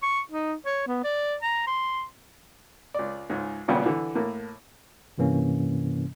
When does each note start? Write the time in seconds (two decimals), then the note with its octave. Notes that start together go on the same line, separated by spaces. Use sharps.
0.03 C#6
0.31 D#4
0.66 C#5
0.87 B3
1.04 D5
1.42 A#5
1.67 C6
2.94 C#2 D5
3.30 C#2 G#2
3.68 G#1 A#2 C#3 G3 B3 G5
3.86 D3 E3
4.15 A2 A#3
5.18 G2 C3 E3 A#3 C#4